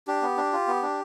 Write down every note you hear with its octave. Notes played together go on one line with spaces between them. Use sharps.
D4 G4
B3
D4
F4
B3
D4